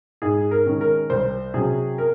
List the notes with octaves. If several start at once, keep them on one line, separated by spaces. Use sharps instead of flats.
G#2 G#4
A#4
D#3 G#3 C#4
A#4
C2 C5
C3 F#3 C#4 G#4
A#4